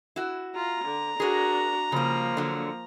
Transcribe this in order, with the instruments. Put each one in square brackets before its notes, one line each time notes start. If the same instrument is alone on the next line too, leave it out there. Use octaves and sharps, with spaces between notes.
[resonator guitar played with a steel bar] E4 F#4
[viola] F4 [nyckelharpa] A#5
[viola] D3
[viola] D4 F#4 [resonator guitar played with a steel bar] G#4 A#4
[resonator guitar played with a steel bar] C#3 G3 [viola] F3 A#3
[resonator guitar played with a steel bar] D3 F#3